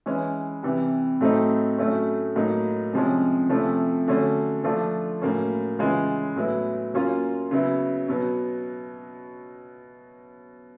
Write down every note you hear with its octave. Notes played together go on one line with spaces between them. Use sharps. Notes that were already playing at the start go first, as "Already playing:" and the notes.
E3 G#3 C#4
C3 E3 G3
A2 F#3 A3 C4 D#4
A2 F#3 A3 C#4
A2 F#3 A#3 D#4
C3 F3 G#3 C#4
C3 F3 A3 C#4 E4
D3 F#3 A3 C#4
F3 A3 D4 F4
A2 F#3 A#3 C#4
C#3 E3 G#3 C#4 F4
A2 F#3 B3 E4
F#3 A#3 C#4 F4
C#3 F#3 B3 E4
B2 F#3 B3